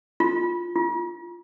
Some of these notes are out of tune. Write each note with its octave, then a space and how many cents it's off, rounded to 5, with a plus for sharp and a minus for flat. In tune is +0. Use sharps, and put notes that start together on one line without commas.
F4 +5
F4 -15